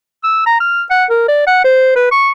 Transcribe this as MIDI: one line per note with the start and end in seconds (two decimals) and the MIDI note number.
0.24 0.45 88
0.46 0.58 82
0.60 0.83 89
0.90 1.05 78
1.10 1.25 70
1.28 1.44 74
1.47 1.59 78
1.65 1.92 72
1.96 2.11 71
2.11 2.32 85